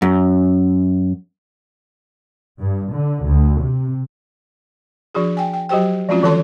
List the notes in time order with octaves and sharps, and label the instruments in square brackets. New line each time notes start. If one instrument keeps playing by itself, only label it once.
[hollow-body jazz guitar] F#2
[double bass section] G2
D3
D2
C3
[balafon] F3 D4 F#4 G#4
G5 G#5
G5
F#3 F#4 G4 C5 G5
F3 G#3 C4 C#4 F4 F#4
D#3 E3 A4 C#5 A5 C6